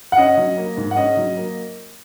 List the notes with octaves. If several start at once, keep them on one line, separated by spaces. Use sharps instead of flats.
F#5
C#4 D#5
F#3
A#3
G#2
F#5
C#4 D#5
F#3
A#3